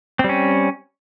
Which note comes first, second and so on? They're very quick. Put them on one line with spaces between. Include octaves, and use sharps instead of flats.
C4 G3 C#4